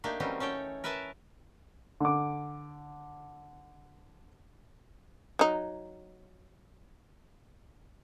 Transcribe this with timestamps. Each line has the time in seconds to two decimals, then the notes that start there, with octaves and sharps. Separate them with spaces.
0.04 A3 A#3 D4 D#4 G4
0.20 E3 F#3 G3 C4 C#4 D#4
0.40 C#4 A4 C#5 G5
0.84 A#4 B4 E5 G#5 A5
2.00 D3 D6
5.39 F#3 D#4